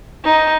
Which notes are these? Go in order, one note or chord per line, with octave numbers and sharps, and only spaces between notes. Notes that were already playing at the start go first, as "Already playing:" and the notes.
D#4